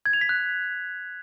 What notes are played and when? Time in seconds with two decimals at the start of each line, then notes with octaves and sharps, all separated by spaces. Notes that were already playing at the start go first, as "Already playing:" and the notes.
0.06 G#6
0.13 F7
0.21 B6
0.29 F#6